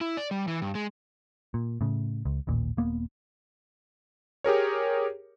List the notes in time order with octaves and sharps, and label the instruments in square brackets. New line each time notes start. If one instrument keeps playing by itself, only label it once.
[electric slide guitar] E4
D5
G3
E3
G2
G#3
[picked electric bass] A#2
A2 C#3
C#2
A1 D#2 A#2
D#1 A#3 B3
[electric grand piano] G4 G#4 A#4 C#5